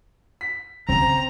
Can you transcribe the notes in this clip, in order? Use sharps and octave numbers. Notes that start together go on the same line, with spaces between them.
B6
C#3 C4 A#5